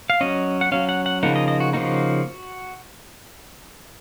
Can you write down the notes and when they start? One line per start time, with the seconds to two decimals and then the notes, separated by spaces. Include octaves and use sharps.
0.10 F5
0.21 F#3 C#4 D#5
0.61 F#5
0.72 F#3 C#4 F5
0.89 F#5
1.06 F#5
1.23 C#3 F3 A#3 D#4 F#5
1.36 D#5
1.48 D#5
1.60 F#4
1.73 C#3 F3 A#3 D#4 F#4